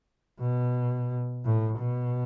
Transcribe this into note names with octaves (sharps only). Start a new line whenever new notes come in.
B2
A2
B2